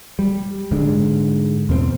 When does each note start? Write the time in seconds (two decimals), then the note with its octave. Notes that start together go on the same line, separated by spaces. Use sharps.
0.19 G3
0.71 G#2 D3 G#3
1.69 E2 B2 A3 C4